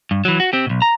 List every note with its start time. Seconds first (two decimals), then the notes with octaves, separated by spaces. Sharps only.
0.11 G2
0.25 E3 F#3
0.40 F#4
0.53 C4 G4
0.67 B1 B2
0.82 A#5